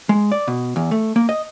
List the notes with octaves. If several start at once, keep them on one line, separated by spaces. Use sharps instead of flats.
G#3
D5
B2
E2
A3
A#3
D#5